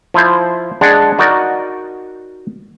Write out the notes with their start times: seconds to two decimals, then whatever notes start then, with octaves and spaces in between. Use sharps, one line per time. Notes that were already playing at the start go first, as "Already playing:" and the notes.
0.14 F3 E4 C5
0.81 G#3 D4 G#4 D5 F#5
1.19 D#4 F#4 A#4 D5 D#5